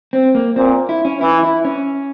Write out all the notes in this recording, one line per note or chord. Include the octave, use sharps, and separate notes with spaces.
C4
A#3
A#2 C4
E4
C#4
E3 E4
E4
C#4